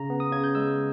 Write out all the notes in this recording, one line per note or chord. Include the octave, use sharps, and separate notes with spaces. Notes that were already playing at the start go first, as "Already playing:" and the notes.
Already playing: C#3 A#5
B3
D#6
C#3 G#6
G6
G#3 E6